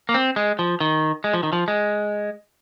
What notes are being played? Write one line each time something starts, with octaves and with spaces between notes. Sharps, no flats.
A#3
C4
G#3
F3
D#3
G#3
F3
D#3
F3
G#3